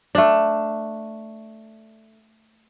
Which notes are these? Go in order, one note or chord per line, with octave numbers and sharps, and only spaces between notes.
A3 D4